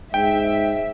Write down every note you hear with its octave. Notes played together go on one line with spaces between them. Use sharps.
G#2 E5 G5